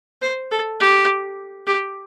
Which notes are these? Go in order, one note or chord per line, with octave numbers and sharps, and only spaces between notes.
C5
A4
G4
G4